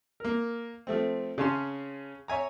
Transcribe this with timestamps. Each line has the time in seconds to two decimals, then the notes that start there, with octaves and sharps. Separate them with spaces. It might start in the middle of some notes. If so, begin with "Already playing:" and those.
0.20 A#3 A#4
0.87 F3 A3 C4
1.38 C#3 C#4 C#5 A5 C6
2.28 C#5 E5 G#5 A#5